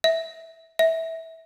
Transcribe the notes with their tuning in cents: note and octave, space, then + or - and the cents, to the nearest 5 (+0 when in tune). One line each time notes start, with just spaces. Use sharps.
E5 -10
E5 -20